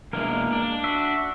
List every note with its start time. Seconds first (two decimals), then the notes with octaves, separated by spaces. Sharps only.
0.13 B2 G#3 A#3 D4 E4 A#4
0.52 D4
0.84 F#4 E5